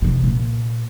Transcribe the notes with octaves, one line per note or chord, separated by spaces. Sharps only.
D#2 C3
A#2